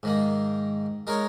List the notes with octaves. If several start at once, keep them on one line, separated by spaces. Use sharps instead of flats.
G#2 D#3 A#3
G#3 D#4 A#4 C#5